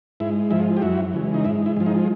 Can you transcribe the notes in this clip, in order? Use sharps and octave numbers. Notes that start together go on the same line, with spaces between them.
G#2 E4
F3 G#3 E4
G4
F#2 E4 F#4
C#3 E3 G#3
D#4
G#2 E4
E4
F3 G#3
D#4